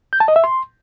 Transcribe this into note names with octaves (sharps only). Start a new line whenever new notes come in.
G6
A5
D#5
E5
C6